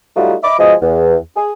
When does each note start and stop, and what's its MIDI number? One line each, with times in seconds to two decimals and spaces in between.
0.16 0.34 54
0.16 0.34 55
0.16 0.34 57
0.16 0.34 63
0.16 0.34 65
0.16 0.34 66
0.43 0.58 75
0.43 0.58 76
0.43 0.58 83
0.43 0.58 86
0.59 0.74 47
0.59 0.74 53
0.59 0.74 56
0.59 0.74 75
0.82 1.16 40
1.37 1.53 68